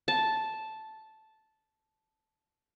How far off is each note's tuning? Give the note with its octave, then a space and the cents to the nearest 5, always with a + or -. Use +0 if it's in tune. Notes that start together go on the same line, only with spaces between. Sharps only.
A5 -5